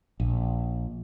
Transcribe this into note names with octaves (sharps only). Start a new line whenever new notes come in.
A#1